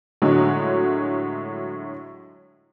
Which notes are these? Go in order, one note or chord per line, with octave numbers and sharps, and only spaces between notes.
A2 D3 F#3 G#3